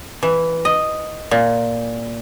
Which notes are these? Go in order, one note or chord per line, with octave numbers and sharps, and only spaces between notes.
E3
D#5
A#2